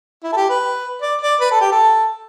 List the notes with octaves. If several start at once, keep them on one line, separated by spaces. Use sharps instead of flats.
E4
A4
G4
B4
D5
D5
B4
A4
G4
A4